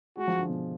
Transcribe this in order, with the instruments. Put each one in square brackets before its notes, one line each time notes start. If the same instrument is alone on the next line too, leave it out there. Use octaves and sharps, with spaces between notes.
[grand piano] G#3 [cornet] F#4
[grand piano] F3
D3
B2